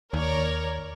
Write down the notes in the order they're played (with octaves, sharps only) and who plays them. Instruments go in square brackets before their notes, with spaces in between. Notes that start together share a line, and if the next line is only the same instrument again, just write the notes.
[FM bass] D#2 [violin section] A#4 C#5 D5